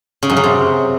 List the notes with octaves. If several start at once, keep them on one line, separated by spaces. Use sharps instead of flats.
C#3
F#2
C#3
C3